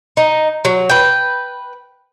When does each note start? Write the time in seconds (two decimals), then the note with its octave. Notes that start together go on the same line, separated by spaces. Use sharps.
0.17 D#4
0.65 F#3
0.90 B4 G5